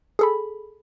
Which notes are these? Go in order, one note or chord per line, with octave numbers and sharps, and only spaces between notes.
G#4 A4 B5